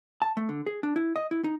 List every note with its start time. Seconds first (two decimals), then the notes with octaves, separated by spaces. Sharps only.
0.22 A5
0.37 A3
0.49 D3
0.66 G#4
0.83 D4
0.96 E4
1.16 D#5
1.31 E4
1.44 D#4